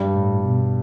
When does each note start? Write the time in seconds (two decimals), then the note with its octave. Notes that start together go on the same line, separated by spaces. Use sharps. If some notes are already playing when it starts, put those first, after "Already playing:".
Already playing: G2 G3
0.14 A2
0.44 B2